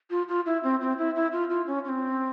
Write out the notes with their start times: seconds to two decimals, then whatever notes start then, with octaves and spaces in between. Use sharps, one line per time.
0.10 F4
0.29 F4
0.46 E4
0.63 C4
0.81 C4
0.98 E4
1.15 E4
1.32 F4
1.50 F4
1.67 C#4
1.85 C#4
1.89 C4